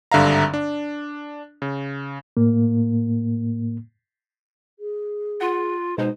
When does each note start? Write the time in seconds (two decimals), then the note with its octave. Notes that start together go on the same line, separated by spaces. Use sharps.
0.12 G#1 G2 D3 E5 F5 A#5
0.54 D4
1.62 C#3
2.37 A2 A#3
4.79 G#4
5.41 F4 F#5
5.98 B2 G#3 D#4 C5